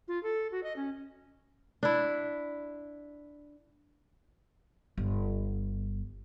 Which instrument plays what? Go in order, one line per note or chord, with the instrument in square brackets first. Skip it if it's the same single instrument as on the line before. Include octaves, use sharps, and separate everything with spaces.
[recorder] F4
A4
F#4
D#5
C#4
[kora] D4 E4
[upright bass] G1